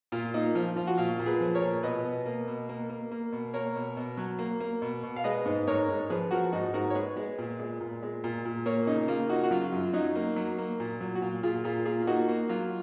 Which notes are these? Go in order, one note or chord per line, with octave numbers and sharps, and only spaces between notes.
A#2 F4
A#3 D#4
F3 F4
F3 F4
F#4
A#2 F4
A#2
G#4 B4
F3
A#4 C#5
A#2
B2 B4 D#5
B2
A#3
B2
A#3
A#3
A#3
B2
A#3 A#4 C#5
B2
B2
F#3
A#3
A#3
B2
B2
F5
G#3 B4 D#5
G#2
G#2 A#4 C#5
G#2
F3 G#4 B4
F3 F#4 A#4
G#2 D#4 F#4
G#2 F#4 A#4
C#5
G#3 G#4 B4
G#3
A#2
G#3
A#2
G#3
A#2
A#2
A#3 A#4 C#5
C#3 D#4
A#3 F4
C#3 D#4 F#4
F#4
F#3 F4
F#2
F#3 D#4
A#3
F#3
A#3
A#2
F#3
F#4
A#2 F4
A#2 F4 G#4
A#2 F4 G#4
A#3 F4 G#4
F4
A#3 D#4 F#4
A#3
F#3 F4